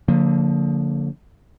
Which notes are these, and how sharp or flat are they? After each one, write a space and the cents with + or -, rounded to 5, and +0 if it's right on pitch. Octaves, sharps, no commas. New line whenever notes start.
D3 -20 F3 +25 A#3 -20